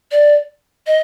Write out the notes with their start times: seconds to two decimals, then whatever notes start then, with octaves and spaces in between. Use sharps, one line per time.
0.12 D5
0.87 D#5